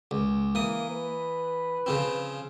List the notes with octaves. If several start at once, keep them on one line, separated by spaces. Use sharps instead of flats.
C#2
E3 A#3 D#6
B4
C#3 F3 C4